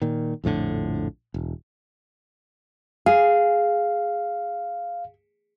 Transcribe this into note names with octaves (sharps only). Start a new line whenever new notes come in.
A#2 D#3
A#1 F2 A2 D3
E1
G#4 F5